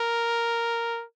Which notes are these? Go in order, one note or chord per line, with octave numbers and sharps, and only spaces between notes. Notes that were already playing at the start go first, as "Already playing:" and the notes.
Already playing: A#4